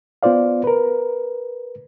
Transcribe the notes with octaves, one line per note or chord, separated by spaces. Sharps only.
B3 F4 C5 D5 F5
A#4 B4